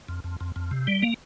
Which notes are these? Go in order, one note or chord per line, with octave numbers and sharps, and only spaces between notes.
F2
F2
F2
F2
C3
G3
A#3